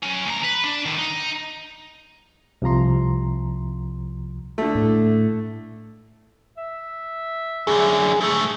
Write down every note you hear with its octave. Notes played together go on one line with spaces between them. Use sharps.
F#3 C#4
D2 A#5
B4
D4
D3 D#3
D#4
C2 C3 F3 A#5 C6
D3 A3
A2
E5
F#2 D3 G#4
G#2 A3